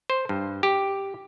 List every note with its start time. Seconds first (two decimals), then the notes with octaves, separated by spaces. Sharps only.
0.10 C5
0.29 G2
0.63 G4